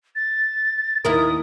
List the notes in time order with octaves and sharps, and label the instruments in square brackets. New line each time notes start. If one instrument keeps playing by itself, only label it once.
[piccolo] A6
[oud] D#2 E4 A#4 [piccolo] D#6